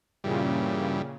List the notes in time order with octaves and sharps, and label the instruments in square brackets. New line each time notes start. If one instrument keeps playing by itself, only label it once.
[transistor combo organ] G2 E3 G3 [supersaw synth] A#2 C#3